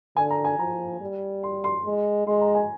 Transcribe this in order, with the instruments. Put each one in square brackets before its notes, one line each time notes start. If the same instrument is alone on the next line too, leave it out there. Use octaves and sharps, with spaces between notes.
[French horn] D3 [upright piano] G#5
[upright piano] A#5
G#5
[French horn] F3 [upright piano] A#5
[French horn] G3
[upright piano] C6
C6
[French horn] G#3
[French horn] G#3 [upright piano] C6
[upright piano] A#5
G#5